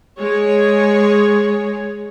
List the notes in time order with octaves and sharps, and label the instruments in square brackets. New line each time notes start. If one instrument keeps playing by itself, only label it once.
[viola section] G#3 G#4 C#5